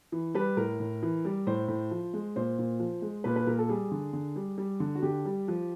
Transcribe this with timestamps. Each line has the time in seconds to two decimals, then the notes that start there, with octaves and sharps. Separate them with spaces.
0.12 E3
0.35 G3 B4
0.57 A2 A#4
0.80 A2
1.02 E3
1.25 G3
1.47 A2 C5
1.68 A2
1.91 F3
2.14 G#3
2.36 A#2 C5
2.58 A#2
2.80 F3
3.02 G#3
3.24 A#2 B4
3.36 B4
3.47 A#2 A#4
3.59 A4
3.69 G3 G#4
3.91 D3
4.13 D3
4.36 G3
4.58 G3
4.80 D3
4.95 F#4
5.02 D3 G4
5.25 G3
5.48 F3